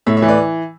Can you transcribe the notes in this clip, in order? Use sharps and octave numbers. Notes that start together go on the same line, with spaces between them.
A2 C#5 E5
C#5 E5
E3
B4 D5